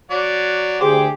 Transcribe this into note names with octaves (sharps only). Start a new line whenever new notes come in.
F#3 D5 F#5
D2 G4 G#4 C5 D6